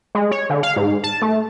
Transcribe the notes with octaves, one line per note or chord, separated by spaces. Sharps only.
G#3
C#5
D3
F5
G#2
A5
A3